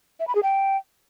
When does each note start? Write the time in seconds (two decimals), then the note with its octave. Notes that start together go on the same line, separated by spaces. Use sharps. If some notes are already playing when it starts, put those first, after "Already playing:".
0.20 E5
0.27 B5
0.35 G#4
0.43 G5